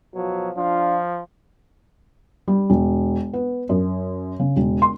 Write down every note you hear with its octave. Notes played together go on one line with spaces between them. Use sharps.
B2 F3 F#3
F3 D4 F4
G3
E1
B3
F#2
C#3
E1
C6